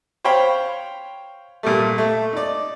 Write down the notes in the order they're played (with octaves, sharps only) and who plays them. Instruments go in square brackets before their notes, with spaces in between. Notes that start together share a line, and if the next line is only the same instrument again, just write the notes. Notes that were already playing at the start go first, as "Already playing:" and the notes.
[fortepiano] C5 C#5 F5 G5 B5
A#2 G3 A3
A3
D#4 D5